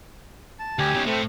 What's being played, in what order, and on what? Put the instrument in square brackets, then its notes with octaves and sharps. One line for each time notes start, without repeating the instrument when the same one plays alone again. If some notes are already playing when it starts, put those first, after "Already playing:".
[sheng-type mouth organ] A5
[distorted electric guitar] D2 [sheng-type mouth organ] G4 G#5
[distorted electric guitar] B1 C#3
[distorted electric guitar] A2 [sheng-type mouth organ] A3 C4